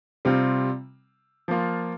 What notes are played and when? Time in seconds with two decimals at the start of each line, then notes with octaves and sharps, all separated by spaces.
0.25 C3 G3 C4 F4
1.48 F3 A#3 F4